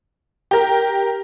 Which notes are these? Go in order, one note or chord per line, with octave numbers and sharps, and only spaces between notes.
G4 A#4